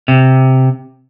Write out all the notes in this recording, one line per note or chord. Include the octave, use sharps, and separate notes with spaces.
C3